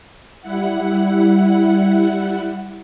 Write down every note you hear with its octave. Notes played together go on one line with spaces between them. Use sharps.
G3 E4 F#5